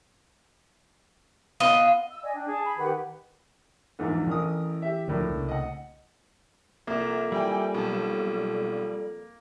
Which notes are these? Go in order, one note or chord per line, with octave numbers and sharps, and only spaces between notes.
B3 F4 D#5 F5
E6
D5 D#5 G#5
D4 G5
G#4 A5
B5
D#3 G4 B4 F#5
A#1 E2 G#2
A1 E3 A#4 D#6
G4 E5
D2 A2 E3 F3 A#3 D4
C2 C#3
D#5 F#5
C2 F2 A#3
G3 E4 G5 G#5
B1 A5